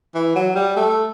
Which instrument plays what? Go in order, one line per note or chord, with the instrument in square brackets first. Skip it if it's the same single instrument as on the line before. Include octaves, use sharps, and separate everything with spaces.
[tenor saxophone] E3
F#3
G3
A3